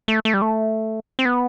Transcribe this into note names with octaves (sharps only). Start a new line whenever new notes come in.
A3
A3
G3
A3
C4
B3